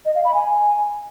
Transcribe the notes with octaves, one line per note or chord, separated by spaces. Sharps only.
D#5
F5
B5
G#5